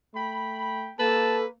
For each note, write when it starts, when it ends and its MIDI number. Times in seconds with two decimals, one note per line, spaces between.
0.15 0.93 57
0.15 0.93 79
0.15 0.93 83
0.99 1.54 58
0.99 1.45 69
0.99 1.46 71
0.99 1.39 81